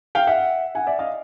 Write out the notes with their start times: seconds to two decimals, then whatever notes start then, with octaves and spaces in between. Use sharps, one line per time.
0.15 F5 G5
0.27 E5 F#5
0.75 F#5 G#5
0.87 D5 E5
0.99 D#5 F5